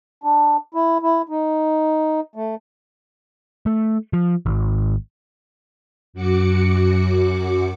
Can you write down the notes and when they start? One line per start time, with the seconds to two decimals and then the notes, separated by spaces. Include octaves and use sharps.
0.24 D4
0.74 E4
1.02 E4
1.29 D#4
2.35 A3
3.66 A3
4.13 F3
4.46 G#1
6.13 F#2 F#4 D6 C#7